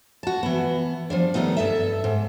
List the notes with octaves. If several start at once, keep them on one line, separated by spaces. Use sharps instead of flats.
F#4 A5
E3 B3
F3 G3 D4
D#3 G3 A3 B3 D#4
G2 A4 E5
G#2